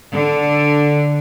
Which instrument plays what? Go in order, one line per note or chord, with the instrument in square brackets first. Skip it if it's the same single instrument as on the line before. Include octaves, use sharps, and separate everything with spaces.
[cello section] D3